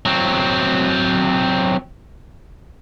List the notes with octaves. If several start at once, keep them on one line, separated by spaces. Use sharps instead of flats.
F#3 C4